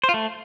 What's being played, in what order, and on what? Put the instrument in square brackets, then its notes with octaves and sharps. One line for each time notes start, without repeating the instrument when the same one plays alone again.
[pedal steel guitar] C5
F4
A3